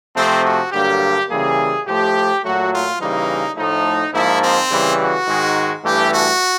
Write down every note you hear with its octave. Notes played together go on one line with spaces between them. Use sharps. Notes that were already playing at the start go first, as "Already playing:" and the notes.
C3 F3 A3 C4
F#4
G2 D3 F#3 A#3 G4
C#3 E3 G3 A#3 G#4
A2 F3 A3 G4
A#2 F#3 A3 F#4
F4
C#3 E3 G3 A#3 D#4
A2 F3 A3 D#4
G#2 F3 A#3 E4
C4
C#3 E3 G3
F#4
G#2 D#3 G#3
G2 E3 A3 G4
F#4